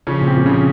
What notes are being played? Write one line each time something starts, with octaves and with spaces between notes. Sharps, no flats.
C#3 F3 C#4
A#2
C4
A#2
C#3 F3 C#4